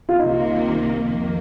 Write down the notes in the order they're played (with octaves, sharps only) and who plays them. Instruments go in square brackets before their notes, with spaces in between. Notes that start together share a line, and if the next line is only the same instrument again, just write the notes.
[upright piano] F4
[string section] C2 C3 D#3 A#3 [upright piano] D#4
[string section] F2 D#3 A#3